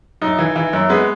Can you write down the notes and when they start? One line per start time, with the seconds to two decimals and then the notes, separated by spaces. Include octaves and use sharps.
0.22 F#2 D#4
0.39 E3
0.56 E3
0.73 F#2
0.89 G#3 B3